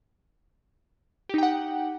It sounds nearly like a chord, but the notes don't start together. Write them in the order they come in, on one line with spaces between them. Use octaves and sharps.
G4 D#4 G5 F#5